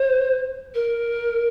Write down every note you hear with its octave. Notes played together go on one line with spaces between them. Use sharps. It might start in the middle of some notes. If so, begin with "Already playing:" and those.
Already playing: C5
A#4